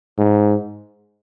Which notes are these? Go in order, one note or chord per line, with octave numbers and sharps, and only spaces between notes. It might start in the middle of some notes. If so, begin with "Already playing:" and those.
G#2